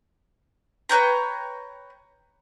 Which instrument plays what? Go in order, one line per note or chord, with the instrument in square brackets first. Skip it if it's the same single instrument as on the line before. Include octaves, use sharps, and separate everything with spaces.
[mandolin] B4 C#5 G5 A#5